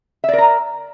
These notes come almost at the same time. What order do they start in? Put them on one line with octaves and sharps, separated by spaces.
E5 D5 A#4 A#5